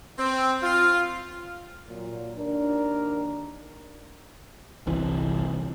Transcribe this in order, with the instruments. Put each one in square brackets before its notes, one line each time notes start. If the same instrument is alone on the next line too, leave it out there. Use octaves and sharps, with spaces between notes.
[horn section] C4
F4
[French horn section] A#2 [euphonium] F#3
[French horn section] D#2 D#3 D4 [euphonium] A#4
[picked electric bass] G1 C2 C3 E3